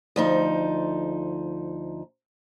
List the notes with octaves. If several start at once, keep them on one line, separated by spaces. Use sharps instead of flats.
D2 F3 D#4